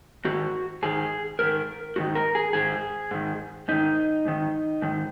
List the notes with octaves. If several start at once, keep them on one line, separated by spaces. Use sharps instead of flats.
G#2 D#3 F#4
G#2 D#3 G#4
G#2 D#3 A#4
G#2 D#3 F#4
A#4
G#4
G#2 D#3 G#4
G#2 D#3
G#2 D#3 D#4
G#2 D#3
G#2 D#3